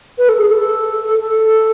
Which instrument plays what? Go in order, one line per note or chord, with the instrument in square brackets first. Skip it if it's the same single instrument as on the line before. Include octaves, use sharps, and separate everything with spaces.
[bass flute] B4
A4
G#4
A4
A4